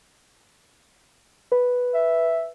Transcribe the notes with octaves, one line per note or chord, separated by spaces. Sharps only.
B4
E5